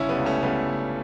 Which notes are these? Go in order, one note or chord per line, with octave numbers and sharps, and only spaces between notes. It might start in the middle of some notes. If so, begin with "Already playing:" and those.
Already playing: G1 C#3 C#4 E4
G3 B3
C#2
A3 C#4
C#3 G3 B3
C#2